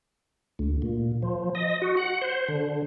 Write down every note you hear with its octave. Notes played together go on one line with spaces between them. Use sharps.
D2
A#2
F3
D#5
F#4
F#5
C5
D3